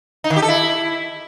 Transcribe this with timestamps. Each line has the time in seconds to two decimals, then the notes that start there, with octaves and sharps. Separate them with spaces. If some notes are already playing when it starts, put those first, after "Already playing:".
0.24 D#4
0.30 D#3
0.36 G4
0.42 A4
0.48 E4